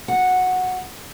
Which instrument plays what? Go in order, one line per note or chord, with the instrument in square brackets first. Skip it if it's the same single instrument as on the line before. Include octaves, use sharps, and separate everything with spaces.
[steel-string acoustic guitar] F#4 F#5